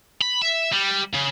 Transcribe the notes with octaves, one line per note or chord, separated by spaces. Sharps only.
B5
E5
G3
C#3